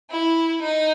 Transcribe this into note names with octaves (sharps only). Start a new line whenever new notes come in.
E4
D#4